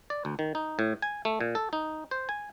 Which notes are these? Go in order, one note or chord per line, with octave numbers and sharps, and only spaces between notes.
D5
D2
D#3
D#4
A2
G#5
A3
A#2
A4
D#4
C5
G#5